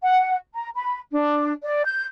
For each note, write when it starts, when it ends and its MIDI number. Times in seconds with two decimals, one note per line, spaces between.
0.03 0.35 78
0.54 0.69 82
0.76 1.00 83
1.12 1.53 62
1.63 1.84 74
1.85 2.06 91